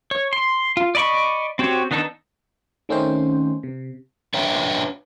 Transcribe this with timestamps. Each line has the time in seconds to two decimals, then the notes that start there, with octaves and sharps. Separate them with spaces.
0.11 C#5
0.33 C6
0.77 F4
0.95 D5 D#5 B5 C#6
1.59 C4 F#4 G4 C#5
1.91 D#3 B3 D4 D#4 A4
2.89 D#3 A3 C4 C#4 D#4 C5
3.63 C3
4.34 D4 B4 C#5 E5 G5 A#5